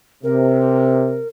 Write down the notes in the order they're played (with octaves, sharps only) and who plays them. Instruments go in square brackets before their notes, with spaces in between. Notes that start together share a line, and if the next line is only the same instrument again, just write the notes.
[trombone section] C3 [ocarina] A#4